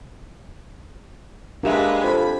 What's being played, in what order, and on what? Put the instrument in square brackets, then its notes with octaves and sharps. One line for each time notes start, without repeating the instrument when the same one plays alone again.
[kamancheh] G#3 B4 [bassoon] A#3 [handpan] D4 G4 E5
[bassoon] F2 [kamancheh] B5